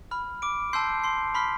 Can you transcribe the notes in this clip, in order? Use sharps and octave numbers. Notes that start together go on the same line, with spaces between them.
B5 F6
D6 D7
A5 C6 E6 G6 C7
C6 C7
B5 C6 F6 B6